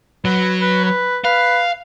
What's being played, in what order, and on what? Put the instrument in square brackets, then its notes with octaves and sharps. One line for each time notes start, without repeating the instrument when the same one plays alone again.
[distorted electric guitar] F#3 [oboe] B4
[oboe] B4
B4
[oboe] B4 [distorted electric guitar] F5